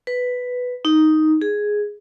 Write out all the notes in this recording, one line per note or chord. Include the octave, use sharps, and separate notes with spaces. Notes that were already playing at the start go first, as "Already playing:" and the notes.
B4
D#4
G#4